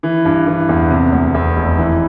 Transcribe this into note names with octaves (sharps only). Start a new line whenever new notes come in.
E3
G2
E3
E2
C3
D2
E2
F1
E3